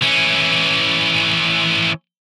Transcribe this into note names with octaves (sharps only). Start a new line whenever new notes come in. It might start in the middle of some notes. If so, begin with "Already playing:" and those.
E3 C#4